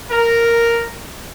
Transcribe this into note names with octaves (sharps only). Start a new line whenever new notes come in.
A#4